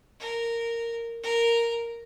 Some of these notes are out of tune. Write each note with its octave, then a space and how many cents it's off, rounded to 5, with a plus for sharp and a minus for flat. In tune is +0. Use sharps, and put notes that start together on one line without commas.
A#4 -10
A#4 -5